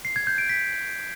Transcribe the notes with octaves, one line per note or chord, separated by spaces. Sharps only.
C7
G#6
G6
D7
B6